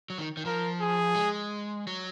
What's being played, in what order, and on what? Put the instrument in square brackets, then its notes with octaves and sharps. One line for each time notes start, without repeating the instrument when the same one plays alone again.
[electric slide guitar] F#3
D#3
D#3
[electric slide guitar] F3 [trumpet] A#4
[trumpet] G#4
[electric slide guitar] G#3
F#3